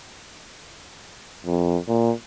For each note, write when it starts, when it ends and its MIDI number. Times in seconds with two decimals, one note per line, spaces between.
1.46 1.78 41
1.88 2.12 46